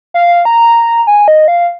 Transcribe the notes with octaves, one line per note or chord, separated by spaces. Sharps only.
F5
A#5
G#5
D#5
F5